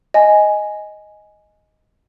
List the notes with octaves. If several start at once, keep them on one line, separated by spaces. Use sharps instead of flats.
D#5 G#5